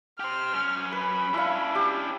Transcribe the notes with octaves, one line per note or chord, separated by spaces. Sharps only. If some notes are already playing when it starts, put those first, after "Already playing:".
G4 C5 F6
F#2 C#4
B4 B5
C#4 D4 E4 F5
G4